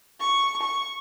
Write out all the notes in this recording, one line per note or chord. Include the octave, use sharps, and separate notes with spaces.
C#6
C#6